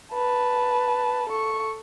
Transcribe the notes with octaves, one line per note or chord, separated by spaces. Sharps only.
B4 A5
A4 C#6